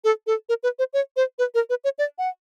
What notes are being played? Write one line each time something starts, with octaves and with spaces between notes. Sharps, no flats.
A4
A4
A#4
B4
C5
C#5
C5
B4
A#4
B4
C#5
D5
F#5